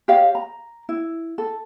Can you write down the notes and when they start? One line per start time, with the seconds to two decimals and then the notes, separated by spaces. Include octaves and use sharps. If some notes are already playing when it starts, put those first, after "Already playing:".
0.08 G4 C#5 D#5 F5
0.35 A#5
0.89 E4
1.38 A4